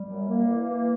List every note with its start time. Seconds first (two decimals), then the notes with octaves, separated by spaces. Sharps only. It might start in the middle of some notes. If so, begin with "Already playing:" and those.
Already playing: G3
0.09 F#2
0.28 F#2 A#3
0.47 E3
0.67 E3